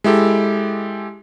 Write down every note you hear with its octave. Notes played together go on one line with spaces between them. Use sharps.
G#3 E4 G4 A4